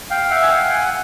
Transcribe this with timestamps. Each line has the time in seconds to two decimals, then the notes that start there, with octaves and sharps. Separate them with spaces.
0.10 F5 G5
0.30 E5 F#5
0.43 G#5
0.49 F5 G5
0.69 F#5 G#5